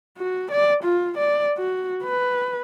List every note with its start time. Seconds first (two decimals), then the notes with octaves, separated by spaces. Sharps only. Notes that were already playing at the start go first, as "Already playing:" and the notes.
0.18 F#4
0.51 D5
0.84 F4
1.18 D5
1.58 F#4
2.04 B4